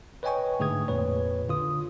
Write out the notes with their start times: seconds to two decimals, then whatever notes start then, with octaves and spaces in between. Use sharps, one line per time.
0.23 B4 C#5 D#5 G5 G#5 C#6
0.59 G#2 D3 A3 G#4 D#6 G#6
0.88 F2 A#2 B4 C#5
1.48 D3 F4 D#6